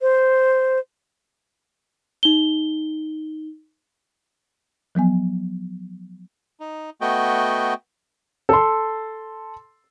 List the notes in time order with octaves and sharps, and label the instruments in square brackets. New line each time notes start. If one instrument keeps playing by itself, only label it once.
[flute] C5
[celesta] D#4 G7
[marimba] F3 F#3 B3 G#5
[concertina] D#4
A3 B3 F#4 D#5 G5
[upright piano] A4 C6